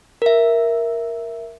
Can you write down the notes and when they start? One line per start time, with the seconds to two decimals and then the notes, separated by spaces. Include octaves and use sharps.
0.22 A#4 E5